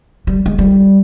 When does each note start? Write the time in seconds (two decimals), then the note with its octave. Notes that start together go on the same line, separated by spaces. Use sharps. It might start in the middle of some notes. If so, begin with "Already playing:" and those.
0.27 G3
0.46 G#3
0.58 G3